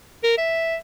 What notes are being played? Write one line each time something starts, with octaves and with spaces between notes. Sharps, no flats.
A#4
E5